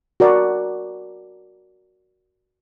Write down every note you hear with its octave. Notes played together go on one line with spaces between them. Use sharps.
F#4 A#4 D5